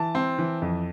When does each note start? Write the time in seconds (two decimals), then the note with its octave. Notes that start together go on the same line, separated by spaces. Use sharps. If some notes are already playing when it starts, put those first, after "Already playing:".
Already playing: E3 A5
0.15 C4
0.39 E3
0.62 F2